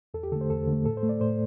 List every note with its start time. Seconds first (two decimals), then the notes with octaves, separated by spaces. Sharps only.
0.14 E2 A4
0.23 G4
0.32 D3 A4
0.36 A3
0.41 C5
0.50 E2 A4
0.67 D3
0.72 A3
0.85 A2 A4
0.97 C5
1.03 A3
1.09 D5
1.21 A2 C5